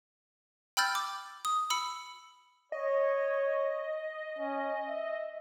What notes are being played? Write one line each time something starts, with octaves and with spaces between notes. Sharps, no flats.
G5 B5 E6 F6 G6 A6
D6
D#6
B5 E6 C#7
C#5 D#5
C#4
E5